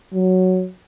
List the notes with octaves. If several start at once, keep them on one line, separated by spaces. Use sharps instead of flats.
F#3